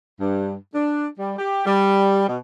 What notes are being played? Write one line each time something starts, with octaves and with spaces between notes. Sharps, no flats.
G2
D4
G3
G4
G3
B2